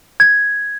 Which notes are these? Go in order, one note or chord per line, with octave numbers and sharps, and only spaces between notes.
G#6